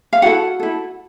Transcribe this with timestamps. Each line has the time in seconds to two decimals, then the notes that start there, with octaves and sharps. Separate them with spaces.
0.13 F5
0.22 E4 F#4 A4 F#5
0.60 E4 A4